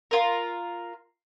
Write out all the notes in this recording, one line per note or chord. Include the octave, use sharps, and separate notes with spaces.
F4 A#4